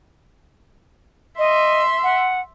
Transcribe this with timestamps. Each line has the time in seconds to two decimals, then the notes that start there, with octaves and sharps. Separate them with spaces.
1.39 D#5 E5 C6
2.03 F#5